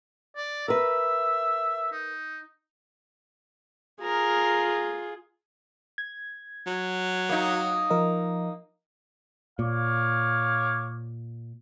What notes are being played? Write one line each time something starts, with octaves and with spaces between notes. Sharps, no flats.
D5
A#4 B4 E5
D#4
F4 G#4 A#4
G#6
F#3
A#3 D#4
F3 A#4 D#5
A#2 C#5 F5 D6